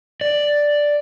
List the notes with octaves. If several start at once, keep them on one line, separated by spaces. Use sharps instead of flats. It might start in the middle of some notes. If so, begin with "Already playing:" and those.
D5